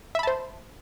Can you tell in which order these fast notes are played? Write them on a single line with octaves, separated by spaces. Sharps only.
E5 B5 A5 C5